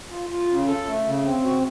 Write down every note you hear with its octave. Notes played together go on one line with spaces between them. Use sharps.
F4
F4
C#3
A4
A3
C#3
C4
F#4